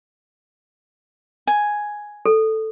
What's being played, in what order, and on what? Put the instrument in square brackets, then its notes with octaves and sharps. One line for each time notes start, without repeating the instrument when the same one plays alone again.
[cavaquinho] G#5
[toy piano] A4